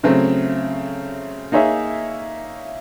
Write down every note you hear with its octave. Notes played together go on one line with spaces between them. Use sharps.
C#3 F#3 A3 C4
A#3 D#4 G#4 C#5 E5